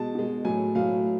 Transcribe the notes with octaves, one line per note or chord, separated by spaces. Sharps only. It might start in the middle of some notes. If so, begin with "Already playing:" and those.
Already playing: B2 G#3 A5
B2 G#3
A2 F#3 G#5
A2 F#3 F5